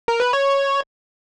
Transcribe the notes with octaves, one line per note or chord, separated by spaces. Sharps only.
A#4
B4
C#5